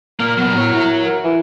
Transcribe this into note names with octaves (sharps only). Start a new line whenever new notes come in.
A#2 A#3 A#4
A#2 F#3 B3
A2 F#4 C#5
E4
A#4
E3 E4